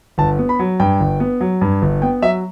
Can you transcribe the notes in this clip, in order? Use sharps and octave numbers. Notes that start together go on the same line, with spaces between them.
G1 A5
B3
B5
F#3
G2 G5
G1
B3
F#3
G2
G1
B3 G5
F#3 E5